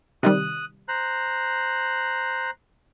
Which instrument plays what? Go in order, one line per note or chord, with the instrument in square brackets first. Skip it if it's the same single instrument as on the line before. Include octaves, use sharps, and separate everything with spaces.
[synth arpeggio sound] C3 D#3 G3 [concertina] D#6 F#6
[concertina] C5 A#5 F#6